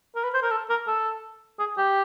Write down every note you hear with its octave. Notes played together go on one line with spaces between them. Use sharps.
A#4
B4
C5
A#4
A4
A#4
A4
G#4
G4